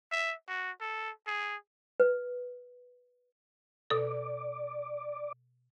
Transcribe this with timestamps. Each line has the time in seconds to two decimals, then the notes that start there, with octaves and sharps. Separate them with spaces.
0.12 E5
0.48 F#4
0.81 A4
1.27 G#4
2.00 B4
3.90 B2 A4 D5